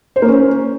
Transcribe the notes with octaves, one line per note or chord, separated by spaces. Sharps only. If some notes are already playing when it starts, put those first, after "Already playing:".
C5
A#3
C#4